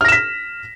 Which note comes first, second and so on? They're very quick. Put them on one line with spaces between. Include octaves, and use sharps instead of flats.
F6 A#6 E7 B6